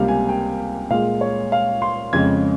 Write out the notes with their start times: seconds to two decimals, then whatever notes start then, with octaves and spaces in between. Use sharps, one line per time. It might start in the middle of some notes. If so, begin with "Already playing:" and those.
Already playing: C#2 C3 G3 A#3 F5
0.08 G#5
0.29 G5
0.90 A#2 G#3 F5
1.21 C#5
1.52 F5
1.82 C6
2.13 F2 C#3 G#3 G#6